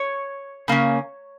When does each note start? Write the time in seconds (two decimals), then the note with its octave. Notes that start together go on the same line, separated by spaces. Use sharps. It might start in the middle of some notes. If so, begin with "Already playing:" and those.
Already playing: C#5
0.68 C#3 A#3 C#4